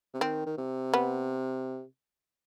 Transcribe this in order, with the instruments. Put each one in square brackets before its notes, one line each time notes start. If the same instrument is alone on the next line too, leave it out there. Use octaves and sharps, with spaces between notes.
[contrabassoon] C3
[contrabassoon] D#3 [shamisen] C4
[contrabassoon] D#3
C3
[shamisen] B3